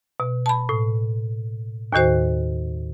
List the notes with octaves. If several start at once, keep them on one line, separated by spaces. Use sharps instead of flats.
B2
A5 B5
A2
D#2 A2 D#3 F#4 C5